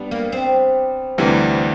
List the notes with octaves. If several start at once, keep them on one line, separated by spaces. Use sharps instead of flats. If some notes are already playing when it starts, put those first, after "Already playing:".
Already playing: G3 B3 D4
A#3
C4
D2 C3 E3 G3